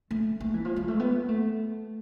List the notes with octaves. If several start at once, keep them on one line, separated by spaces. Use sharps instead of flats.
A3
A3
E3
F3
G#3
A3
B3
A3